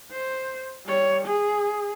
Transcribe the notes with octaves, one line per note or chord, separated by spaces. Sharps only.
C5
G3 C#5
G#4